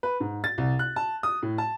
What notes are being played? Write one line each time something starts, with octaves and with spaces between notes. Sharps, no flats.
B4
G#2
A6
C2
F#6
A5
D#6
A2
A5